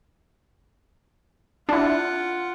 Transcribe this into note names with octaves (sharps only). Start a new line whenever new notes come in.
D4 E4 F4 F#5